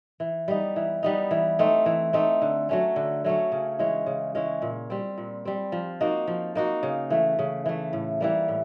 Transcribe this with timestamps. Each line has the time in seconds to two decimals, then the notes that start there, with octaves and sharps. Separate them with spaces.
0.20 E3
0.48 G3 B3 D#4
0.76 E3
1.03 G3 B3 D#4
1.31 E3
1.59 A3 C4 D#4
1.86 E3
2.13 A3 C4 D#4
2.42 D3
2.69 F#3 A3 C#4
2.96 D3
3.24 F#3 A3 C#4
3.52 C#3
3.79 E3 G#3 C#4
4.06 C#3
4.35 E3 G#3 C#4
4.62 A#2
4.90 G3 C4
5.18 A#2
5.45 G3 C4
5.72 F3
6.01 A#3 D#4 F#4
6.27 F3
6.55 A#3 D#4 F#4
6.83 C#3
7.10 E3 A3
7.39 C#3
7.66 E3 A3
7.93 A2
8.21 E3 G3 A#3
8.48 A2